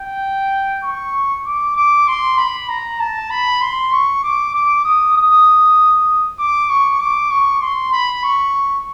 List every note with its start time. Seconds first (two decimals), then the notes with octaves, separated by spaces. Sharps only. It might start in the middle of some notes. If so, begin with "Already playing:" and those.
Already playing: G5
0.84 C#6
1.46 D6
1.76 D6
2.08 C6
2.38 B5
2.69 A#5
3.00 A5
3.30 B5
3.61 C6
3.92 C#6
4.23 D6
4.54 D6
4.84 D#6
5.16 D#6
6.39 D6
6.69 C#6
7.00 D6
7.31 C#6
7.61 C6
7.92 B5
8.23 C#6